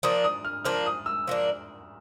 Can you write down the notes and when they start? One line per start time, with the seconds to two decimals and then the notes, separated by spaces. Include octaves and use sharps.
0.03 F3 A#3 D4 D#6
0.24 D#6
0.45 F6
0.65 F3 A#3 D4 F6
0.86 D#6
1.06 E6
1.27 F3 A#3 D4